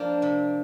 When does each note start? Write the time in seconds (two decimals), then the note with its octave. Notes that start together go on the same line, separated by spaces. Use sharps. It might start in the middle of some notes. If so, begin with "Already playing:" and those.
Already playing: F3 A#3 D4
0.22 C3